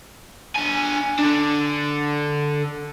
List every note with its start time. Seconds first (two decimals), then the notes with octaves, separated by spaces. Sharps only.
0.56 D4 G#5
1.19 D3 D4